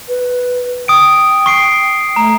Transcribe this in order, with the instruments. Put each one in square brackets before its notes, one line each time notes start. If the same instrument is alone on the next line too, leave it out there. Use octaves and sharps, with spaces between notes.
[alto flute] B4
[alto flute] G5 [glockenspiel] D#6 D7
[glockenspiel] C#6 C7 D7
[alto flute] A3 [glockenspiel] A#5